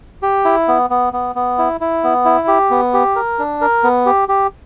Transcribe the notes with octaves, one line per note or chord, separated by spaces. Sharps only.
G4
E4
B3
B3
B3
B3
E4
E4
B3
E4
G4
B3
G4
A#4
D4
A#4
B3
G4
G4